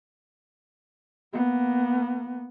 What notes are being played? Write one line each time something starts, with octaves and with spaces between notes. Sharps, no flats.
A#3 B3